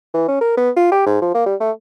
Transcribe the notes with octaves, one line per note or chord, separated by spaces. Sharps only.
E3
C#4
A#4
B3
F4
G4
G#2
F3
A#3
G3
A3